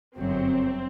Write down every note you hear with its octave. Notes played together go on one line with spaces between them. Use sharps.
G1 F#2 F#3 C4